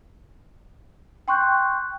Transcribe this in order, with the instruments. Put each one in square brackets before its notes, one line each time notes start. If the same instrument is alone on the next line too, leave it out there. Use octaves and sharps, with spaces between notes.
[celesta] G5 C6 C#6 F#6 G6